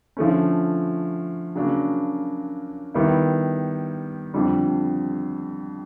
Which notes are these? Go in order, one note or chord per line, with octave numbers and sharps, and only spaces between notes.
D3 F3 A3 C#4
C#3 F#3 A#3 D4
D#3 G3 B3 E4
F2 D3 G3